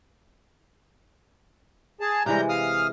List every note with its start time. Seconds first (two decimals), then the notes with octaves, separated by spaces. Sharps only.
2.01 G#4 A5
2.26 C3 E3 G3 G#3 A#5 G6
2.49 F5 D#6 F6